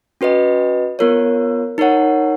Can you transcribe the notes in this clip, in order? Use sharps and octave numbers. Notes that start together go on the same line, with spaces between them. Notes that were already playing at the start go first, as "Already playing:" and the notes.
C#4 F#4 B4 D#5
B3 F4 A#4 C#5
D#4 A#4 C#5 F#5